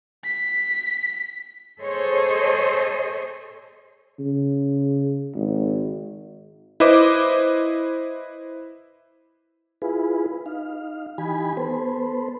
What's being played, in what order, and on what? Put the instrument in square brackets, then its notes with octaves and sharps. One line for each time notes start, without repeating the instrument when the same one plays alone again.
[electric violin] B6
[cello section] G#4 A4 C5 C#5 D#5
[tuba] C#3
G#1
[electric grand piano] E4 B4 C5 D#5 D6
[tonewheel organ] E4 F4 G#4 B4
D#4 F5
E3 D#4 G4 G#5 B5
B3 A4 B4 C5